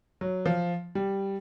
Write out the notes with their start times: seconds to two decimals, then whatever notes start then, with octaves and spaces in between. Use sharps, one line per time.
0.21 F#3
0.46 F3
0.95 G3